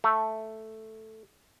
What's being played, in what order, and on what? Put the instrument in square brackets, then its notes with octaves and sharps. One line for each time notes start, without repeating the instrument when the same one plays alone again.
[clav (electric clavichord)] A3